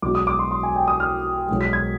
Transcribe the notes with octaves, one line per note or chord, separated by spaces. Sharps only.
B1 B2 G#3 D6
D#6
D6
C6
C6
G#5
G5
D#6
F6
B1 B2 G#3
B6
G#6